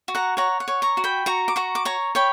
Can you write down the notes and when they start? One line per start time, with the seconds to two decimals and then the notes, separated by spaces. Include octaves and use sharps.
0.08 F#4
0.15 F#5 A#5
0.37 C#5 F#5 A#5
0.60 F#5
0.68 C#5
0.82 A#5 C#6
0.97 F#4
1.04 G5 B5
1.26 F#4 A#5 C#6
1.48 D6
1.56 F#4 A#5 C#6
1.75 D6
1.85 C#5 A#5 C#6
2.15 C#5 G5 B5